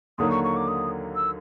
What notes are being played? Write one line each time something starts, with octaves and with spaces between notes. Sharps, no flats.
D#2 D3 F#3 A#3 D#4 D#6
C#6
C#6
D6
D#6
E6